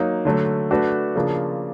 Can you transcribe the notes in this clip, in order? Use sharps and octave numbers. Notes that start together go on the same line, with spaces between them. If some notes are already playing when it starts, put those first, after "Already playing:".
Already playing: F#3 A#3 D#4
D3 F#3 A3
A3 D4 F#4 B4
C#3 F3 A#3 D4 F4